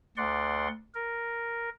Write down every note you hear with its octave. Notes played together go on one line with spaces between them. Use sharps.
D2 D5 F#5 C6
A#4